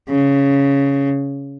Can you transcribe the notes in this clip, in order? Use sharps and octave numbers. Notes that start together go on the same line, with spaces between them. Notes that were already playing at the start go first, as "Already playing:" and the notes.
C#3